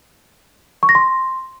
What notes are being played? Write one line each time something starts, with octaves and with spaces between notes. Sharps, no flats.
C#6
A#6
C6